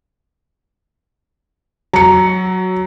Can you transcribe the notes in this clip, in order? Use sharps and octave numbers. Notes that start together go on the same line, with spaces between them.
F#3 A#5 C#7